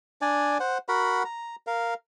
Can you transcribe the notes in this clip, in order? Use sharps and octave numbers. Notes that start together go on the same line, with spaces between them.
D4 D5 G#5
C5 F#5
F#4 A#4 F#5 B5
A#5
A#4 F5